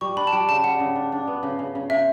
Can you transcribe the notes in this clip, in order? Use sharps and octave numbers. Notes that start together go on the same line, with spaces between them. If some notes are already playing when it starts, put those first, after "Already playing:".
G3 C#6
D4 B5
A5
G3 G5
C#3 A5
G3 F#5
C#3
D4
D4
B3
C#3
C#3
C#3
C#3 E5